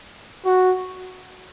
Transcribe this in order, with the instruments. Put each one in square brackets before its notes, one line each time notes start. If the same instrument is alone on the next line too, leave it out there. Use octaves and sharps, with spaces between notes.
[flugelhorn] F#4